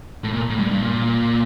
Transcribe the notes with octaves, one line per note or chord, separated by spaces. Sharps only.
A2
A#2
A2
G2
G2
A#2